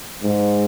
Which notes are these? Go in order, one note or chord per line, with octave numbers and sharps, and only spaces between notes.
G#2